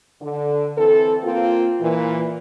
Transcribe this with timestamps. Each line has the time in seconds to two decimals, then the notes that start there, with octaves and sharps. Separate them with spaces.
0.21 D3
0.78 E3 C4 A4
1.24 A#3 C4 F4
1.81 A#2 E3